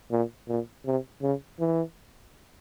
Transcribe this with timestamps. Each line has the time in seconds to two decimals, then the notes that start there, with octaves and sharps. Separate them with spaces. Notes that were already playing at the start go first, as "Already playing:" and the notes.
0.11 A#2
0.48 A#2
0.86 C3
1.22 C#3
1.60 E3